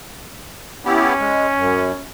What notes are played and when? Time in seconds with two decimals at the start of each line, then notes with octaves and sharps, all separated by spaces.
0.85 B3 C#4 E4 G4
1.20 G#3
1.57 F#2